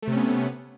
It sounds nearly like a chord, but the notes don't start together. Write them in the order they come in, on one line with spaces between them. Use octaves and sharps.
A3 C3 C#4 B3